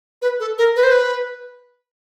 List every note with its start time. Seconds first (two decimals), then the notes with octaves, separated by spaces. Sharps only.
0.22 B4
0.40 A4
0.58 A#4
0.76 B4
0.83 C5
0.91 B4